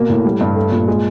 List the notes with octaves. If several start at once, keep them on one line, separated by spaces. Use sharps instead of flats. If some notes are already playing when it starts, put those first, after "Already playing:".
Already playing: B2 A#3
A2
G3
G2
A3
A#2
G#3